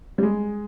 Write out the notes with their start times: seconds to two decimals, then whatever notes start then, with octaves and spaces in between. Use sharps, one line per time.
0.18 G3
0.23 G#3